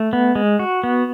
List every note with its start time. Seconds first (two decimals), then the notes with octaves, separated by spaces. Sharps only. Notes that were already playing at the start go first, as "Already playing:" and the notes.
Already playing: A3
0.13 B3
0.35 G#3
0.59 F#4
0.84 B3